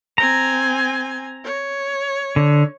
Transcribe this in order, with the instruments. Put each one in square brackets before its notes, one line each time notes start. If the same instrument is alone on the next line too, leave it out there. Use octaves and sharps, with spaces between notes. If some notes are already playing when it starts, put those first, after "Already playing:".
[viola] C4 G#5 [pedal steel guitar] A#5
[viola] C#5
[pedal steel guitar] D3